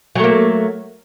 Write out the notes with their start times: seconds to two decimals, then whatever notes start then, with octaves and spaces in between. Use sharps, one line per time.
0.15 F#3
0.20 A3
0.24 A#3